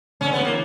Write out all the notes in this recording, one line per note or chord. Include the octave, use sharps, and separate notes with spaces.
D3 C#4
C#3
B3
D3
A#3
C#3 E3